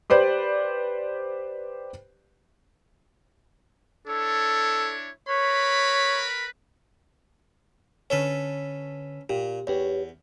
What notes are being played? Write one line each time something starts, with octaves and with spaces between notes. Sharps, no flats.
G4 B4 C5 D5
D4 E4 A4 C#5
A#4 B4 C#5 B5
D3 C#4 A4 B4 C#5
A#2 G4
E2 G4 B4 C#5